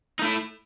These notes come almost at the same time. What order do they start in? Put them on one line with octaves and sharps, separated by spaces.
D#4 A3 E4